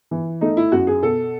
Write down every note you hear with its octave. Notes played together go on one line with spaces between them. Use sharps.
E3
A3 D#4
E4
F#2 F#4
G#4
B2 A4